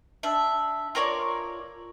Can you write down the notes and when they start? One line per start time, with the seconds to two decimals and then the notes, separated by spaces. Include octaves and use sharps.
0.23 D4 E5
0.95 F4 A#4 C#5 D5